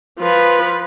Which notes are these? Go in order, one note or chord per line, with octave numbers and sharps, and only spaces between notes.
F3 B4